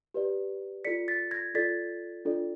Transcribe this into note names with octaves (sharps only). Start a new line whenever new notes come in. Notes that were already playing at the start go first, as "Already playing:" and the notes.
G4 B4 D5
F4 A4 D5 B6 C#7
A6 B6
G#6 A#6
F4 A4 D5 A6 B6
D4 F4 A4 D5